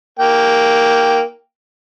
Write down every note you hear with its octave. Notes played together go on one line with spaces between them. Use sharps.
A#3 G5